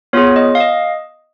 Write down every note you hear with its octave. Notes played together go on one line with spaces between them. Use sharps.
B3 F4 G#4 C#5
D#5
F5
D#5